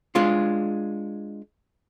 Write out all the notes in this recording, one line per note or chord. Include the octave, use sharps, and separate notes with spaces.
G#3 D4 F4